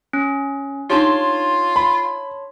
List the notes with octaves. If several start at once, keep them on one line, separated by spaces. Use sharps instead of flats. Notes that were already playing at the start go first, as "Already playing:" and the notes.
C#4
D4 D#4 F4 G4 C#5 A5 C6
B5